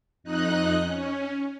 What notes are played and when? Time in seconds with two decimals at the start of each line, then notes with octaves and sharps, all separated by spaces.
0.24 F2 D#4 D#5 F#6
0.84 C#4